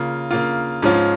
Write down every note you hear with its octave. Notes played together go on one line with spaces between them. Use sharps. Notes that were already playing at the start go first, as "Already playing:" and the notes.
Already playing: C#3 A#3 F4
C#3 A#3 F4
G#2 F3 C#4 F4